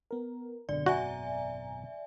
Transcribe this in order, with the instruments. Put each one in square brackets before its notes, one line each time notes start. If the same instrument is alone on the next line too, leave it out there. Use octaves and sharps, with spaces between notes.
[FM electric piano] B3 A#4
[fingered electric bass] G#1 F#2 B2 [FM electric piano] D3 [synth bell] D5
[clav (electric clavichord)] F#4 [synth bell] D5 E5 G#5 [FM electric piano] A#5